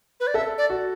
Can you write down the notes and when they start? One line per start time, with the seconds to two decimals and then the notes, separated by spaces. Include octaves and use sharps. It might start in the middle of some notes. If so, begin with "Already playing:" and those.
0.20 B4
0.27 D5
0.34 A4 E5
0.58 D5
0.70 F#4